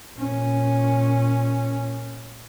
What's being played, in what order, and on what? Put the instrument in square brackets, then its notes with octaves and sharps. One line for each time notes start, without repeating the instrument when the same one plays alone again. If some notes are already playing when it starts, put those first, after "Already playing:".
[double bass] A#2 C#4